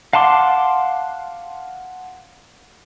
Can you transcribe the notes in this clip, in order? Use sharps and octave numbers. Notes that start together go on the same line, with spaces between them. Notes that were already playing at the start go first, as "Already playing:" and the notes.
F5 F#5 A5 C6 D6